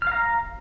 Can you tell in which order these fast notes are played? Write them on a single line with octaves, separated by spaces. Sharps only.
F6 F5 A#5